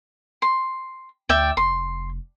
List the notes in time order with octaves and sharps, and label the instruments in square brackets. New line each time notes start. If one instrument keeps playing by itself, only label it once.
[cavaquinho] C6
[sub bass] D2 [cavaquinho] D5 E5 G5
[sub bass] F1 [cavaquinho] C6